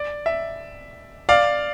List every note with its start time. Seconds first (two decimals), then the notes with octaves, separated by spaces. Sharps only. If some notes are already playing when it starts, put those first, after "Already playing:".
Already playing: D5
0.26 E5
1.29 D5 F5